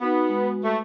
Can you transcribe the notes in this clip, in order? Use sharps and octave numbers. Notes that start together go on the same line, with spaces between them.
B3 D#4 F#4
G#3 F#4
A3